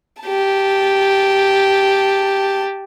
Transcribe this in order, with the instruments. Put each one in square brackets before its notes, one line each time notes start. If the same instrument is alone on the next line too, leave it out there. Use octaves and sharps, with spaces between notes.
[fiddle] G4 A5